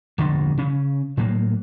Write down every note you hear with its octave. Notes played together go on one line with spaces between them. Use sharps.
E1 A#1 G2 D3
C#3 C#4
A2 F#3 A#3